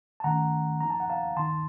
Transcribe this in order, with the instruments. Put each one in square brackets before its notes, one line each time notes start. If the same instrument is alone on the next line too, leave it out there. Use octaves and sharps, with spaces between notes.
[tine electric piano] A5
D#3 A3 C#4 F#5 A#5
F3 A#3 D#4 A#5
A5
F#5
F5 A5
D#3 A#3 D#4 A5 C6